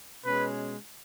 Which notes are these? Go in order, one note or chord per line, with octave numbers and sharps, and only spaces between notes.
B2 G#3 C#4 B4